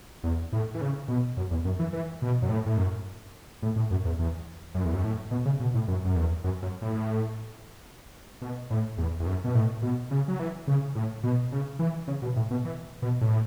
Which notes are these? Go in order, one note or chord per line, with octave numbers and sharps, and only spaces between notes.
E2
A2
E3
C#3
B2
F#2
E2
F#2
E3
E3
B2
F#2
A2
A2
F#2
A2
A2
F#2
E2
E2
F#2
E2
F#2
A2
B2
C#3
B2
A2
F#2
F#2
E2
F#2
F#2
A2
B2
A2
E2
E2
F#2
B2
A2
B2
C#3
F#3
E3
C#3
A2
B2
C#3
E3
C#3
B2
A2
B2
E3
B2
A2